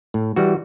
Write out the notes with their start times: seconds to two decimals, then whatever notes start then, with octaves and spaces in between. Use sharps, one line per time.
0.14 A2
0.36 E3 G3 F#4